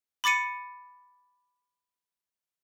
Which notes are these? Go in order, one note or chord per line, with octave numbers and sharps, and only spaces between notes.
B5 D6 A6 C#7 D#7